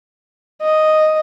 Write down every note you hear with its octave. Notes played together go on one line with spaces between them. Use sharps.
D#5